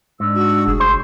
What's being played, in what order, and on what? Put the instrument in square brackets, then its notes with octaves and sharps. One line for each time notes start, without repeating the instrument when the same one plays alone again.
[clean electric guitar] G#2 [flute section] D4 E6
[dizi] F#4
[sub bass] F1 [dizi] G#4
[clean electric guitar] C5